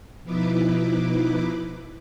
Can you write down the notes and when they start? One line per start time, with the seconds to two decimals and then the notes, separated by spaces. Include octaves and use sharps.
0.24 B2 F3 D#4 E4 B4 D6